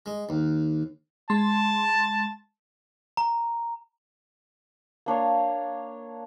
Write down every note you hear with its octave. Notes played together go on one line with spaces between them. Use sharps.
G#3
D#2
G#3 A5 C6
A#5
A#3 D4 C#5 F5